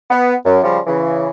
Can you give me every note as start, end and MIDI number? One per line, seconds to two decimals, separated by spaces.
0.10 0.34 59
0.45 0.59 42
0.63 0.78 49
0.63 0.78 53
0.63 0.78 55
0.87 1.29 49
0.87 1.29 52